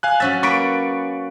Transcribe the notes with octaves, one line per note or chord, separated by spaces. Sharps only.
F5 G#5 F#6
F#3 C#4 E5 A6
A#3 B4 C#6 B6 D7